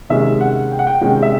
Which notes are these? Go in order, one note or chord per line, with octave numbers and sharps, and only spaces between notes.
C3 D#3 G#3 C#4 E5
F#5
G5
F#5
G5
C3 D#3 G#3 C#4 G5
E5